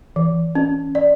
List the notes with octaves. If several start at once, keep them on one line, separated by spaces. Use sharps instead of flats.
E3
C#4
D5